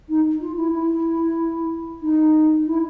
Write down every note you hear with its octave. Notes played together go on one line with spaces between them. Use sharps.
D#4
F4
E4
E4
D#4
E4